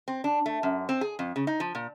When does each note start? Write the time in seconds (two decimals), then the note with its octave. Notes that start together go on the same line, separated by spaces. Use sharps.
0.08 C4
0.24 D4
0.46 A3
0.63 F#2
0.89 C4
1.01 G#4
1.19 F2
1.36 C#3
1.47 D#4
1.60 F3
1.75 A#2